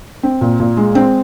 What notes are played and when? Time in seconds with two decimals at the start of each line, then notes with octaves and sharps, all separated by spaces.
0.23 C4
0.41 A#2
0.60 A#2
0.77 G#3
0.95 C4